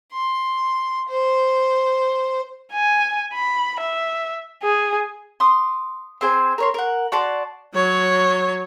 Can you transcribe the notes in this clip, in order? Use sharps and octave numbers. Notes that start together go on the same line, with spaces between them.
C6
C5
G#5
B5
E5
G#4
C6 D6 D#6
C4 G#4 C5 G#5
A#4 C#5 C6
A#4 F#5
F#4 D5 A5 C6
F#3 C#5